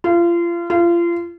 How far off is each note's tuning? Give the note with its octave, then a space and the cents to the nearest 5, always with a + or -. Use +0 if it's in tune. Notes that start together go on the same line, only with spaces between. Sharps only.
F4 -30
F4 -30